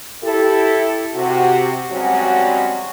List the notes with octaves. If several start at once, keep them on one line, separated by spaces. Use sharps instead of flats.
E4 G4 A4
C3 F#4
G2 F#3 G#3 C4 C#4 F#4